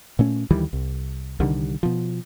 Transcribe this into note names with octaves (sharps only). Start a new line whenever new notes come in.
A#2 A3 C#4
D2 D#3 E3 G3
C2
C2 D3 D#3 G3
B2 F3